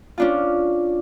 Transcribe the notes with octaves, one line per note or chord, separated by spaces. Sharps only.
C#4 D4 F4